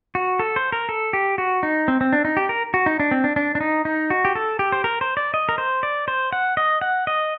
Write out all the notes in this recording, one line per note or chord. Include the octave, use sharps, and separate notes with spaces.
F#4
A4
C5
A#4
A4
G4
F#4
D#4
C4
C4
D4
D#4
G4
A#4
F#4
D#4
D4
C4
D4
D4
D4
D#4
D#4
F#4
G4
A4
G4
C5
A#4
C5
D5
D#5
A#4
C5
D5
C5
F#5
D#5
F#5
D#5